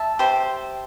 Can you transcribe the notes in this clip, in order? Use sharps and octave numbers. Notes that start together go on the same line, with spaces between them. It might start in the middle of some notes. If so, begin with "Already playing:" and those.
Already playing: E5 A5
G4 C5